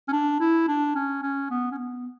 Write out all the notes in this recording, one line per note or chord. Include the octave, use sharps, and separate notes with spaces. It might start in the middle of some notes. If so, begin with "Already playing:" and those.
C#4
D4
E4
D4
C#4
C#4
B3
C#4
B3